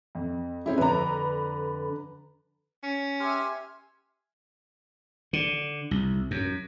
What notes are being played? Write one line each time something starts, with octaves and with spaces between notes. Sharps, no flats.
F2
C4 C#4 E4 G#4
F2 D3 B4 A#5
C#4
G4 E5 G#5 C6 F6
D3
C2
F#2